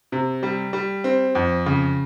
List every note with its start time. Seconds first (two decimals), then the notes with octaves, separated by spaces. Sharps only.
0.12 C3
0.43 G3
0.73 G3
1.04 C4
1.35 F2
1.66 C#3